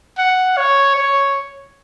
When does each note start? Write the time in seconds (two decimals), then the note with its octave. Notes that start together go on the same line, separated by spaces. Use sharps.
0.18 F#5
0.57 C#5
0.96 C#5